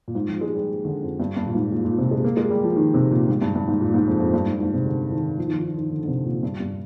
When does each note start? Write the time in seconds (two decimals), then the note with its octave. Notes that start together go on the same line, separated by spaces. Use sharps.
0.08 A#2
0.15 G#2
0.28 F3
0.41 G#3
0.55 G3
0.85 D3
1.02 F2
1.20 G2
1.37 G2
1.47 A#2
1.55 G#2
1.72 A#2
1.85 A#2
1.98 C3
2.11 G#3
2.24 A#3
2.37 G#3
2.50 G3
2.64 F3
2.76 D#3
2.94 C3
3.11 A#2
3.28 G#2
3.42 G2
3.55 G2
3.67 G#2
3.81 A#2
3.94 G#2
4.08 F2
4.20 F2
4.34 G2
4.46 G#2
4.60 G#2
4.73 C3
4.85 D3
5.12 D#3
5.38 F3
5.47 D#3
5.51 F3
5.64 D#3
5.78 D#3
5.90 D3
6.03 D3
6.08 C3
6.25 A#2
6.43 G2
6.60 G2